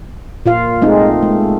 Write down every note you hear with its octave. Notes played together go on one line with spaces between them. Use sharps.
A#2 F4 F5
G#3 A3 C4 D#4
G#3 A3